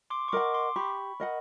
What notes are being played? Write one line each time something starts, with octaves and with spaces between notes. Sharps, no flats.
C6 D6
C#6
A#4 D#5 F#5 C6 D6
C6 D6
G4 B5 C#6
A#4 D#5 F#5